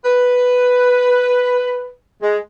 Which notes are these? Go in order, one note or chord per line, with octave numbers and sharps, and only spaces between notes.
B4
G#3